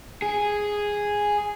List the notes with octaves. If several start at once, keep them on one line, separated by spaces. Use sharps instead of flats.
G#4